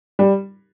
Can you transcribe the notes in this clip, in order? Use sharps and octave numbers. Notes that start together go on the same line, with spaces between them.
G3